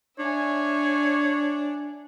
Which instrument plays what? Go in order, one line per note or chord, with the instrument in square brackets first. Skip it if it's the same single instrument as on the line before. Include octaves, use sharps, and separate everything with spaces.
[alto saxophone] D4 [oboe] C#5 [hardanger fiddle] E5 G#5